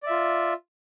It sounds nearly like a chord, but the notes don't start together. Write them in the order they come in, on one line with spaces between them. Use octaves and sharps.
D5 E5 F4